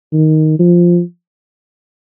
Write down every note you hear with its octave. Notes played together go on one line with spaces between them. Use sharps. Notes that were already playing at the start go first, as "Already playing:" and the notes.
D#3
F3